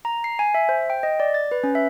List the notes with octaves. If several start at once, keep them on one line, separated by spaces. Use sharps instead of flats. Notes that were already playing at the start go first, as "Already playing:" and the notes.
A#5
C7
G#5
E5
C5
G5
D#5
D5
A6
B4
C#4
E5